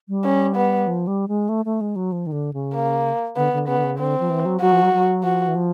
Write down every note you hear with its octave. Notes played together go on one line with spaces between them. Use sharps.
G3
C#4
B3
F3
G3
G#3
A3
A3
G#3
F#3
F3
D#3
D3
C#3
A#3
D3 B3
D3
C#3 B3
D3
C#3
D3 C4
F3
E3
F#3
F#3 F#4
F3
F#3
F#3
F3 F#4
E3
F3